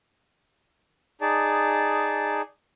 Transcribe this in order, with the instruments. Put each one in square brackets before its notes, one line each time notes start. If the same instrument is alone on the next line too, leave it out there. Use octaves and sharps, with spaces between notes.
[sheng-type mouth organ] D#4 G#4 D5 A5